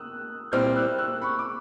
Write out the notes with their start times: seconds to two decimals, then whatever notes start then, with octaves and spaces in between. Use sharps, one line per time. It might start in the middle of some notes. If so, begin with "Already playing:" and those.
Already playing: D#6 E6 F#6
0.52 A#2 G3 C4 E4 F6 G6
0.75 E6 F#6
0.98 E6 F#6
1.22 B5 C#6
1.39 D6